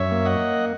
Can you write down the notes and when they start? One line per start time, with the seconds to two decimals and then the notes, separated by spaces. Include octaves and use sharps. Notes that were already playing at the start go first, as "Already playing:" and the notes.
Already playing: F#2 C#5 E5
0.12 A#3
0.25 D#5 F#5